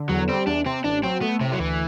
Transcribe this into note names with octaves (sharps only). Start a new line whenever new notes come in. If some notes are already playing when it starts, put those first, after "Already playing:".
Already playing: D3
E2 F#3
G3 C4
E2 D4
C3 C4
A1 D4
F#3 C4
A3 B3
A2 C3
F#3
D2 E3